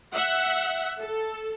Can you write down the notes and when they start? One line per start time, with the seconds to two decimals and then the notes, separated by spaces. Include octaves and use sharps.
0.13 E5 F#5
0.99 A4